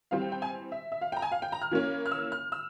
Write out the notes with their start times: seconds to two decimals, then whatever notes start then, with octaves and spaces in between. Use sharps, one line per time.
0.11 E3 G3 C4 F5
0.22 G5
0.32 G5
0.42 G#5
0.72 E5
0.92 E5
1.01 F5
1.12 G5
1.16 A#5
1.22 G#5
1.32 F5
1.42 G5
1.52 A#5
1.62 F6
1.71 E3 A#3 C#4
2.06 F6
2.11 E6
2.32 F6
2.52 E6